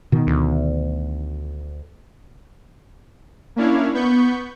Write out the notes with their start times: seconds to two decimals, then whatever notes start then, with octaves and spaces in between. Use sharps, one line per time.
0.12 B2 D#3
0.27 D2
3.56 A#3 C#4 D4 E4 C#5 F5
3.94 B3 B5 C#6 G6